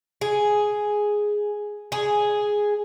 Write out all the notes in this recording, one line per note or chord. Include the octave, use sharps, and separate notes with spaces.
G#4
G#4